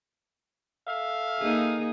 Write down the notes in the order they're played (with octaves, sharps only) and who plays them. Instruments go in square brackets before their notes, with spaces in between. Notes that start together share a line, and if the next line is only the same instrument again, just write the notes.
[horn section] A4 E5 F5
[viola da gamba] A#3 D#4 G#4